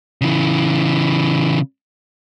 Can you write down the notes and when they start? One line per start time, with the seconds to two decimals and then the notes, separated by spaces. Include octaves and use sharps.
0.21 C#3 E3